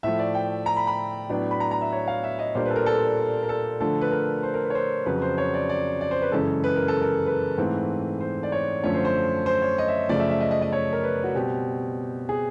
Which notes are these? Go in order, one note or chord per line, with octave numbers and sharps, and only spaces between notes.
A2 F3 A3 E5
D5
G5
A#5
B5
B5
A2 F#3 B3 D4
B5
A#5
A#5
E5
C#5
F5
E5
D#5
A#2 G3 A#3 D4 C5
B4
A4
A#4
A4
A#4
A4
D3 F3 A3 A4
B4
A#4
C5
A#4
B4
C#5
C5
F2 C#3 F#3 B4
C5
C#5
D5
D5
D5
C5
B4
F#2 C#3 E3 G#3 A4
B4
A#4
A4
A#4
B4
G#2 E3 A3 C4
C5
D5
C#5
F#2 D3 F3 A3 C#4 C#5
C5
C5
C5
C#5
D#5
E5
F#2 C#3 F3 A3 D5
E5
E5
D#5
D#5
D#5
C#5
A#4
B4
F#4
B2 G3 C4 G4
G#4